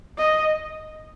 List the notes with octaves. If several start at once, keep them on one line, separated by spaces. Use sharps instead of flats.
D#5